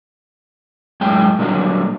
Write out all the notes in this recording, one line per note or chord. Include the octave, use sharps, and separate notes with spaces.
F#2 A2 G#3 G#4 G5
A#2 D3 E3 F#3 G3